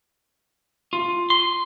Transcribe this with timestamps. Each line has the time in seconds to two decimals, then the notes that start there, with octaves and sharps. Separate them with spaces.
0.93 F4
1.30 C6